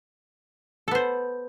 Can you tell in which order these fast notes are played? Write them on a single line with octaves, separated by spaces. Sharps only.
A4 B3 C5